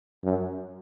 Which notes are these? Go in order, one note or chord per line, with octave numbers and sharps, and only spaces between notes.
F#2